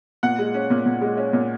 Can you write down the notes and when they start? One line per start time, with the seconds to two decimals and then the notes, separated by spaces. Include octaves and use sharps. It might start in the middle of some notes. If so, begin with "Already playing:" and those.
0.23 A#2 F#5
0.39 G#3
0.54 C#4
0.70 A#2
0.86 A#2
1.01 G#3
1.17 C#4
1.33 A#2